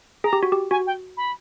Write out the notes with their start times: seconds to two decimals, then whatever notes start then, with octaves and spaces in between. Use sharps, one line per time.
0.24 G#4 A#5
0.33 G4
0.43 F#4
0.52 G4
0.71 F#4 G#5
0.87 G5
1.17 B5